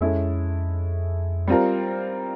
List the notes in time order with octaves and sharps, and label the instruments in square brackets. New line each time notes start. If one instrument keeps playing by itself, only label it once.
[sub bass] F2 [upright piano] G#3 C#4 E4 A4
[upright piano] G3 C4 F4 A#4